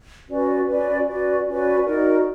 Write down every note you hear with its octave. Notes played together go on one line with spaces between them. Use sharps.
C#4 F#4 B4 D5
C#4 F#4 B4 D5
C#4 F#4 B4 D5
C#4 F#4 B4 D5
D#4 F#4 A#4 D5